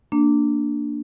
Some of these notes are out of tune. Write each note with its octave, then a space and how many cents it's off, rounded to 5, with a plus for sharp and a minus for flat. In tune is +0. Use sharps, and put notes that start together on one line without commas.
A#3 -10 D4 +0